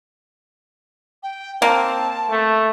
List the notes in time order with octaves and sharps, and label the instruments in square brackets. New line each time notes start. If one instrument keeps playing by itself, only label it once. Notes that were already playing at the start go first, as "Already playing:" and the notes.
[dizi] G5
[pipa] A#3 [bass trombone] C4 [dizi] A5
[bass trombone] A3